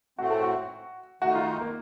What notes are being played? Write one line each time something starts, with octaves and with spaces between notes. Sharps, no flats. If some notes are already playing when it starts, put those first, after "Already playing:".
A2 A3 C4 F#4
A4
F#4
D#3 A3 D#4 F#4
F4
A#3